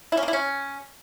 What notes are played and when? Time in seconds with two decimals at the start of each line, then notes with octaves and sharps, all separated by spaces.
0.12 E4
0.17 C#4
0.23 A#3
0.28 E4
0.33 C#4